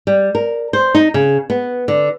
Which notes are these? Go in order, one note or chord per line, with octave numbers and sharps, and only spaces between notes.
G3
A#4
C5
D#4
C#3
B3
D3